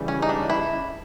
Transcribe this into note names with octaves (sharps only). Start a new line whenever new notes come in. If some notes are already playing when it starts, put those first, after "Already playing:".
Already playing: C#3 E3 G3
C#4
D#4
D4
E4